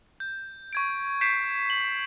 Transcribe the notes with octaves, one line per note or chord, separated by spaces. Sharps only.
G6
C#6 G#6 D7
G6 B6 C7 D7 E7
F#7